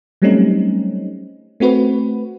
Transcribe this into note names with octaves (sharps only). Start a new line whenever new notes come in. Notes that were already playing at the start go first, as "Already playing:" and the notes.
F#3 G3 A3 C4 C#4 D#4
A3 C4 F#4 B4